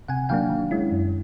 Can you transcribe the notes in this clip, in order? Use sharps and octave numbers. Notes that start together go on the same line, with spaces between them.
C3 F#5 G#5
D#3 F#3 A#3 D4 F5 G5
D#3
G#3 C#4 E4
F#2